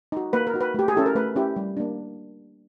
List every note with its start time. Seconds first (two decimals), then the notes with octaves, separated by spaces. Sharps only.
0.12 D#4 F#4
0.33 A#3 B4
0.47 A#4
0.54 D#4 F#4
0.61 B4
0.74 A3 G4
0.88 G#4
0.95 C#4 E4 G4 A4
1.06 A#4
1.15 A3 B4
1.36 C#4 E4 G4
1.56 G3
1.77 A#3 D4